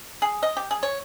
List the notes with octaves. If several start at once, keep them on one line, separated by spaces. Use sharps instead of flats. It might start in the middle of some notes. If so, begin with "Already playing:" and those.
G#4
D#5
G4
G#4
C#5